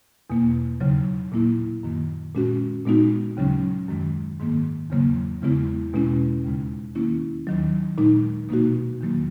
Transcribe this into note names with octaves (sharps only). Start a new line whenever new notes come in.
E2 B2 A#3
D#2 C#3 F#3
A#2 A#3 E4
F#2 D#3 A#3
A#2 G#3 C#4 F#4
A#2 G#3 B3 D#4 F#4
D#2 C#3 F#3 C#4
F#2 D#3 G#3
G#2 D#3 A#3
E2 C#3 F#3 A#3
E2 C#3 G#3 B3 E4
E2 B2 G#3 C#4 E4
D#2 C#3 G#3
D#3 A#3 C#4 E4
D#2 D#3 F#3
A#2 G#3 D#4
B2 A#3 D#4 F#4
E2 D#3 F#3 A#3